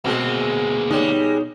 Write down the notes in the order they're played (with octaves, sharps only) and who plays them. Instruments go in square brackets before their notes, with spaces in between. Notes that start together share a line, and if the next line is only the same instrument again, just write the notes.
[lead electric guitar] D2 A#3 [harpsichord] B2 [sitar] G#3 C4
[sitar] G3 G#3 [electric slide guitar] D#4 C#5